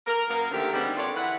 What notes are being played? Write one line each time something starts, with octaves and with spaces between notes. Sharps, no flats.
A#4
F#2 A#3 B3 A#4
D3 D#3 F3 A3 G4
D#3 G3 G#3 B3 C4 D4
F2 D3 F4 C#5 D5
E3 B4 F#5